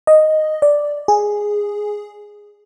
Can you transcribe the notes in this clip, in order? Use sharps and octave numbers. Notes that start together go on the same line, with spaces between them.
D#5
D5
G#4